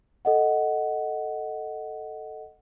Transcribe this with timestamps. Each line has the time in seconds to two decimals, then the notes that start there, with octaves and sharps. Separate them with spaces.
0.25 A4 D#5 F#5